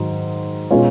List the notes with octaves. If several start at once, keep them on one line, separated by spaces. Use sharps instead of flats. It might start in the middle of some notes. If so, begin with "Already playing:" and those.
Already playing: G#2 D#3 F#3
B2 G#3 C#4 F4